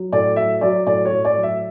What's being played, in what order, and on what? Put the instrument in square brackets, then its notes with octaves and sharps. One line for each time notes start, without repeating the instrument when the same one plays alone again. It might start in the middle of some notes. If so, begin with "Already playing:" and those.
Already playing: [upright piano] F#3
A2 D5
F#3 E5
F#3 D5
A2 D5
C#5
A2
D5
F#3
E5